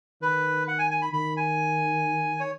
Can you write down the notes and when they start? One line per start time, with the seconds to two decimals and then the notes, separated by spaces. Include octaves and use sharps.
0.21 D#3 B4
0.68 F#5
0.79 G#5
0.91 G#5
1.02 B5
1.13 D#3 B5
1.37 G#5
2.40 C#5